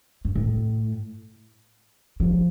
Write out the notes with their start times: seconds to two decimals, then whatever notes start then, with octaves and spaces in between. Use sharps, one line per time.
0.25 G2
0.35 A2
2.20 F3